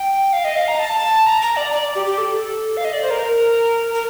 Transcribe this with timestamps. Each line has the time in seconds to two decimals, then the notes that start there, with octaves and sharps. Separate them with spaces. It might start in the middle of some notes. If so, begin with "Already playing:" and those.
Already playing: G5
0.33 F5
0.45 D#5
0.56 F5
0.68 A#5
0.79 A5
1.26 A#5
1.42 A#5
1.56 D5
1.73 D5
1.95 G4
2.06 G4
2.18 A4
2.77 F5
2.85 D#5
2.93 D5
3.03 C5
3.11 A#4
3.94 A#4